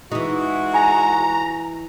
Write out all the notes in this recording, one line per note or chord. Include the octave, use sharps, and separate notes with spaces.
E3 G#3 D#4 F#4
G#5 A#5